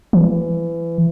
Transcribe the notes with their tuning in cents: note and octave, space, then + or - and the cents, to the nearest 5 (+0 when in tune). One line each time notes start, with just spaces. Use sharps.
E3 +25